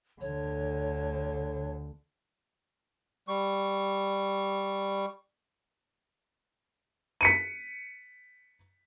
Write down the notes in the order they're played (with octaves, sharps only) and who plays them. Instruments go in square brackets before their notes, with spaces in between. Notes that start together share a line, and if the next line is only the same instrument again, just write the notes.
[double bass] D2 D3 [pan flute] C#5
[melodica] G3 C#6
[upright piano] B6 C#7 D#7